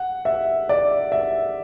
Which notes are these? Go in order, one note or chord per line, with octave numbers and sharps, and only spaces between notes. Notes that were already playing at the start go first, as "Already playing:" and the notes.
Already playing: F#5
E5
D5
E5